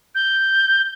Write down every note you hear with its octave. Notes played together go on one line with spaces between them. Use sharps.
G6